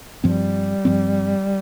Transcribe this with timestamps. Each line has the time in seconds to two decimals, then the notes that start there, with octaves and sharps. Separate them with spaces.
0.24 G2 F3 G3 C4
0.85 G2 F3 C4